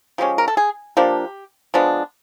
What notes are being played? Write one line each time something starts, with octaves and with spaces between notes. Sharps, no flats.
F3 G#3 C#4 G4
A#4
A4
G#4
F3 A#3 D4 G4
F3 G#3 B3 D4